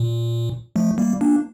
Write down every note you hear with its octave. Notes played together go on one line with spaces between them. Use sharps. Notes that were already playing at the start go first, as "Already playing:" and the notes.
Already playing: A#2
F3 A3
G3 A#3
A#3 D4